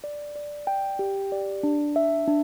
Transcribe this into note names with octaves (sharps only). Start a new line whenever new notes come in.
D5
D5
G5
G4
D5
D4
E5
D4